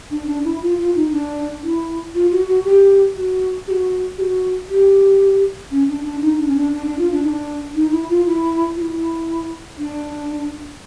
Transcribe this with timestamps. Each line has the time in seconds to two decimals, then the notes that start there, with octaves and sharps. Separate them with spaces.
0.11 D4
0.27 D4
0.45 E4
0.62 F4
0.78 F4
0.96 D#4
1.12 D4
1.63 E4
2.15 F4
2.31 F#4
2.48 F#4
2.65 G4
3.16 F#4
3.67 G4
3.71 F#4
4.18 G4
4.21 F#4
4.69 G4
5.71 C#4
5.89 D4
6.05 D4
6.22 D#4
6.39 D4
6.48 C#4
6.56 D4
6.74 D4
6.86 D4
6.99 F4
7.12 D4
7.24 D#4
7.28 D4
7.75 D#4
7.92 E4
8.09 F4
8.27 E4
8.76 F4
8.81 E4
9.78 D4